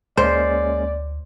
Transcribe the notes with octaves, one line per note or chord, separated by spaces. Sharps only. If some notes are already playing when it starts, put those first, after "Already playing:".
D2 G#3 A#3 C#4 C5 D5